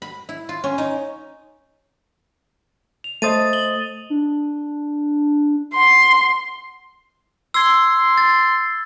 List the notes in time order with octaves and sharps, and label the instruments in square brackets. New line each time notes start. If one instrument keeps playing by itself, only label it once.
[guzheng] B5
E4
F4
C#4
D#4
[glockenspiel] F7
[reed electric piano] A3 C5 D#5 [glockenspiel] D#6 A6 D#7
[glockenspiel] F#7 G7
[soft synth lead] D4
[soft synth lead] F#5 [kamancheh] C6
[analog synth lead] C6 [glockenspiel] E6 G#6
[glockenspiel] A6